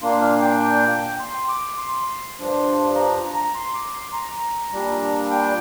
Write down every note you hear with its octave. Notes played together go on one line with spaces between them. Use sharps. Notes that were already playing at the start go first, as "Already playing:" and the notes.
A#2 A#3 D4 C6
F5
G5
C6
D6
C6
G2 F3 D4
A#5
A#5
A#5
C6
D6
C6
A#5
A#2 G3 D4
G5